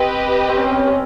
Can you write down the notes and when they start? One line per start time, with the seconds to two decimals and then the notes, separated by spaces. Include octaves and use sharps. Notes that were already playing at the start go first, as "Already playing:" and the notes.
Already playing: C4 G4 B4 D#5
0.49 C4
0.56 C#4
0.64 C4
0.72 C#4
0.79 C4
0.87 C#4